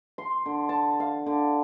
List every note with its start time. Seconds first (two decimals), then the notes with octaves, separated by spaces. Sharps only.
0.18 C6
0.46 D3
0.69 A5
1.00 F5
1.26 D3